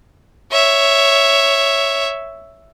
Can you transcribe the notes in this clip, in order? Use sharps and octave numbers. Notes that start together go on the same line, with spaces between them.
C#5 E5